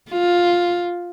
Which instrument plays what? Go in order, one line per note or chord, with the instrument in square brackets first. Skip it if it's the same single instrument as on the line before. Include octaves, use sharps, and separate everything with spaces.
[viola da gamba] F4